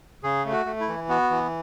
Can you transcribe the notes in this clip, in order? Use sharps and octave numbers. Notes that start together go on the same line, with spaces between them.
C#3 G#4
A3
F#4
A3
E4
E3
B3 F#4
E3